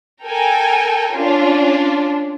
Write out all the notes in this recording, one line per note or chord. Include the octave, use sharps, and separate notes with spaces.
A4 A#4 G5 G#5
C#4 D4 F4